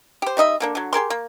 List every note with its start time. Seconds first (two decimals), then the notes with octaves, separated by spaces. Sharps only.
0.22 G4 C5
0.37 G3 D#4 D#5 E5
0.60 D3 A#3 D4
0.75 D3 F#3
0.93 G4 G#4 A#4 C6
1.10 A#3